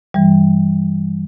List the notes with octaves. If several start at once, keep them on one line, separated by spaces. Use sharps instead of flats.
G2 E3 G3